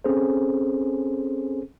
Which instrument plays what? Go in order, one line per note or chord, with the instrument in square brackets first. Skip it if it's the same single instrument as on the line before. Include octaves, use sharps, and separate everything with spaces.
[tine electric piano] C4 C#4 G#4 A4 C5